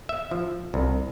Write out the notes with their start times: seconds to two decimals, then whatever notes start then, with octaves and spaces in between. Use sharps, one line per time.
0.09 E5
0.31 F3
0.74 C2